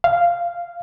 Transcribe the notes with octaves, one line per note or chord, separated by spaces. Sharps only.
F5